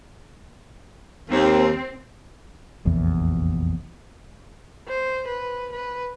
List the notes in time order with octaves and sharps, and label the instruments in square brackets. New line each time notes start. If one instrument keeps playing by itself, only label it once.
[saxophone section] D#2 [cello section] C4
[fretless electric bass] F1 A#1 E2
[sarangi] C5
B4
B4